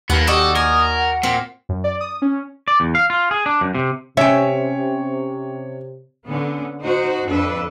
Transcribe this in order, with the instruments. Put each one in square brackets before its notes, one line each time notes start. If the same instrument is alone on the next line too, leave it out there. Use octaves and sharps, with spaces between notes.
[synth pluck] D#2 [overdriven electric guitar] A#3 B3 [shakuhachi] B4 [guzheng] F#5
[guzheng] F#4 D5 D#5 [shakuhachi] G4 [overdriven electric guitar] A4
[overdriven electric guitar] A#4 [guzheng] G#5 [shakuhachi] D#6
[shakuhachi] F#5
[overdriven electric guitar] A#2 [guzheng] C4
[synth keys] F#2
D5
D#6
C#4
[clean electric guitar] D5
E2
F5
F4
G#4
D4
F#2
C3
[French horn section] C3 [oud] C#4 [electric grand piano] C#5 [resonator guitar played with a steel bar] E5 G5
[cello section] D3 B3 C#4
D#4 F#4 C5
F2 D4 A4 B4